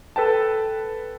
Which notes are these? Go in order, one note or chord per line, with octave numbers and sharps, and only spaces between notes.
A4 B4 G5 A5